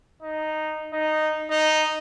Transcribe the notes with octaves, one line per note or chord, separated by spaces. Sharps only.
D#4
D#4
D#4